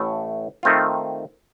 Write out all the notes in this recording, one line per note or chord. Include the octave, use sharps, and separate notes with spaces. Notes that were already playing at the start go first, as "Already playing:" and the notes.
Already playing: A1 A2 A3
D#3 A3 C4 F4